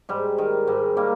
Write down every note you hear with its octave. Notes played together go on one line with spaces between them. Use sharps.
G#2 G3
D#3
G#2 G3
D#3 G3 A#3